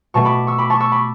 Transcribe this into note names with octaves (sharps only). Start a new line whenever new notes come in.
B2 A3 A5 C#6
B5 D6
C#6 E6
B5 D6
A5 C#6
C#6 E6
B5 D6